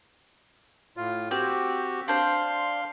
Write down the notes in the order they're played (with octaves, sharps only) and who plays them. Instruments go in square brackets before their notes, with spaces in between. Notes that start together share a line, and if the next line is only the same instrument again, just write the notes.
[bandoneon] A2 F4
[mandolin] C4 [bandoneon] F#4 G4
[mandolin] D4 C5 [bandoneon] F5 C6